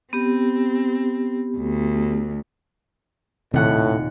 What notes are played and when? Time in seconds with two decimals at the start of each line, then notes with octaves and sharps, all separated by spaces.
0.13 B3 C4 G4
1.57 D2
3.54 D#1 A2 C3 C4 F#5 F#6